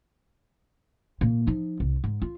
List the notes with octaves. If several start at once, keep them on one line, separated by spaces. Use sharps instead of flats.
A#2 A#3
F3 D#4
C2
G#2
F4